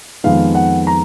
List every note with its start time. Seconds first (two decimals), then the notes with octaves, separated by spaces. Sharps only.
0.24 F2 D#3 G#3 B3 F5
0.55 F#5
0.87 A#5